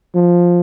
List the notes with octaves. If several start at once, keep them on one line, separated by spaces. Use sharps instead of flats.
F3